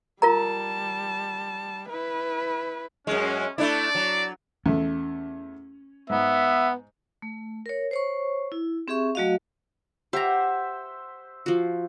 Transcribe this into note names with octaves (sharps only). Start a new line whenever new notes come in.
G3 F4 A#4 A5 A#5
E4 B4
F#2 G#3 C#4
A3 D4 E4 D5
F#3
E2 A3 C#4
G#2 B3 E5
A3
A#4 C#5
C5 C#5 C#6
E4
C4 G4 G#4 E5 C#6
F#3 A3 F#4 D#5 F5
G4 C5 E5 F#5 A#5
F3 F#4